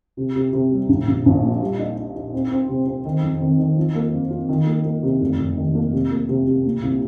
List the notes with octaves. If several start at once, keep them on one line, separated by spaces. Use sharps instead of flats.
C3
C3
C3
G3
A#1
A#1
A#1
A#2
G3
D#4
D#4
D#4
C4
C4
C3
C4
D#3
F2
D#3
D#3
F3
A#3
F2
F4
D#3
A#3
A#3
C3
F1
F1
D#3
A#3
C3
A#3
C3
C3
A#2
C2